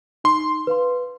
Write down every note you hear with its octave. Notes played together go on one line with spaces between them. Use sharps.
D#4 C6
B4 F5 C6